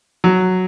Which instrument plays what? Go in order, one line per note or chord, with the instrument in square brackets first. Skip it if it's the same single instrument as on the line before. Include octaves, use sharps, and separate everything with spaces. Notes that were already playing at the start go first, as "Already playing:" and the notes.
[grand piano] F#3